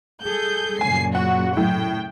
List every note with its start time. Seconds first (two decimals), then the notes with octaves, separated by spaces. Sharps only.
0.24 G3 G#4 A4 G6
0.81 F#2 A#2 C#3 G#5 C7
1.15 F#4 F#5
1.57 A2 F#3 G5